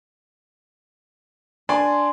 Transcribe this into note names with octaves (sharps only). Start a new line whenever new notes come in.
D4 D5 G#5 C6